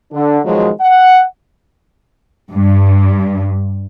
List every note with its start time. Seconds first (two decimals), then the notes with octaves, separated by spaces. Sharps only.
0.13 D3 D4
0.45 B2 D#3 F3 F#3 G#3
0.81 F#5
2.52 G2